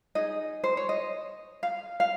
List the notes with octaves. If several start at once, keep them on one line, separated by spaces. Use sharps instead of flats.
D#4 G#4 D#5
C5
C#5
D#5
F5
F5